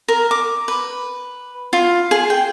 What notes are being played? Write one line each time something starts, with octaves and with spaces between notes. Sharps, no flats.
A#4
D6
B4
F4
G#4
G5